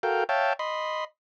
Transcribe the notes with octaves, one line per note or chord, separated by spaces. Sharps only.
F#4 A4 A#4 F5 G5
C#5 E5 F5 G5 A5
D#5 B5 C6